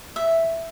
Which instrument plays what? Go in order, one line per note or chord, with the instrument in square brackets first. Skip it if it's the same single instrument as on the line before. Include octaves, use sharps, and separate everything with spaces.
[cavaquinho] E5